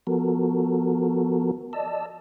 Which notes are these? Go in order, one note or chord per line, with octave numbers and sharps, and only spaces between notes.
F3 B3 F#4 A4 A#4
D5 D#5 A5 E6